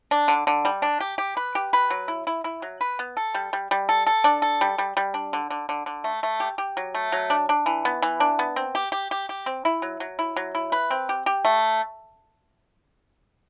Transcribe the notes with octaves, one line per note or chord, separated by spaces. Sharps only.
D4
D3
D3
G3
D4
G4
G4
B4
G4
B4
F#3
E4
E4
E4
F#3
B4
B3
A4
G3
G3
G3
A4
A4
D4
A4
G3
G3
G3
D4
D3
D3
D3
D3
A3
A3
G4
G4
F#3
A3
F#3
D4
D4
E3
B3
E3
D4
B3
C4
G4
G4
G4
G4
C4
E4
F#3
F#3
E4
F#3
E4
B4
C4
G4
G4
A3